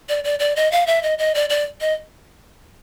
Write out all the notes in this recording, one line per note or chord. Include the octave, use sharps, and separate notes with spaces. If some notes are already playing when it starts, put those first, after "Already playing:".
D5
D5
D5
D#5
F5
E5
D#5
D#5
D5
D5
D#5